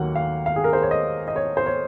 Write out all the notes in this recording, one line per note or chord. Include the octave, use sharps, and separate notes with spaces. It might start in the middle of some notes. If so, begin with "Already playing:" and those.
Already playing: D#2 D#3 F#3 A#3 F#5
F5
F5
G#4
A#4
C5
C#5
D#5
D#5
C#5
C5
C#5